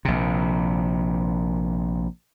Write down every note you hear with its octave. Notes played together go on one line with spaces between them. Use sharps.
A#1 C3